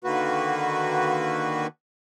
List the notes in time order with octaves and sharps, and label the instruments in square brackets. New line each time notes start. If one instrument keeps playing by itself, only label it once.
[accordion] D3 D#3 A#3 F#4 B4